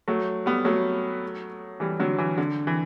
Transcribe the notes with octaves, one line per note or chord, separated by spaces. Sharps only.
F#3 A3
G3 B3
F#3 A3
E3 G3
D3 F#3
E3
D3
E3